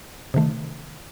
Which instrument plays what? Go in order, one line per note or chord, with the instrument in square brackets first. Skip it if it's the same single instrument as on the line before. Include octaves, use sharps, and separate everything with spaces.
[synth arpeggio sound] C3 D#3 A3